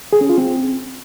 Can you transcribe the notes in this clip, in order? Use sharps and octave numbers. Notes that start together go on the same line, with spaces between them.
G#4
C#4
F4
C4